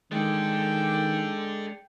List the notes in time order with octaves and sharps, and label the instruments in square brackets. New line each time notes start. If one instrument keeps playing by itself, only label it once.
[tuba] D#3 [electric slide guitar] G#3 [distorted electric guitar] D4 A4 [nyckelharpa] G5